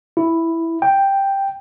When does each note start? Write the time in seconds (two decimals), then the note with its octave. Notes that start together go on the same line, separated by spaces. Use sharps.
0.17 E4
0.82 G5